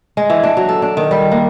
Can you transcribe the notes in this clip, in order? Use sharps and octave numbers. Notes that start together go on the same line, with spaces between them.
G#3
E3
D4
F#3
A4
D4
D#3
G3
A#3